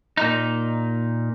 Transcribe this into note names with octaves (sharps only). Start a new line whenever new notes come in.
A#2 D#4